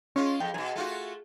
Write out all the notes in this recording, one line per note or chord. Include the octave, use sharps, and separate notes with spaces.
G#3 C#4 F4
F2 G5
F#2 B2 G#4
A3 F4 F#4